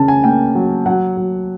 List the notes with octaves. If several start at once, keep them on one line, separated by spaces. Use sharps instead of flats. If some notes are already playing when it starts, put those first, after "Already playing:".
Already playing: C#3 C#4 A5
G#5
A#3 G5
F#3
F#3 F#5
F#3